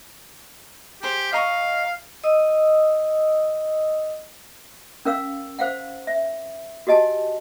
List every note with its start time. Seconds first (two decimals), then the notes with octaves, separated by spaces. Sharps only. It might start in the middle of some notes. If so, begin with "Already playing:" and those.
1.03 G4 G#4 C5
1.32 D#5 F5 A#5 C#6
2.24 D#5 D#6 E6
5.05 C#4 A#4 F5 E6
5.59 C5 F5 F#5
6.07 E5
6.87 F#4 G4 D#5 G#5 A5